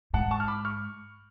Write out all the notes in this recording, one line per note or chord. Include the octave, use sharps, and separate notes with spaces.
G#2 F#5 A5
A5 C#6
F6
B5 D6
C#6 F6